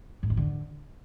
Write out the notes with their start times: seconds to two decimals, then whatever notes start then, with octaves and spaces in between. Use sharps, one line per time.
0.23 G#2
0.30 B2
0.37 D3